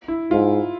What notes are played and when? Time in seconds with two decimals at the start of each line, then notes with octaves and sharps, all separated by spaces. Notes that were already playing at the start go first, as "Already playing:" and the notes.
0.08 E4
0.31 G#2 F4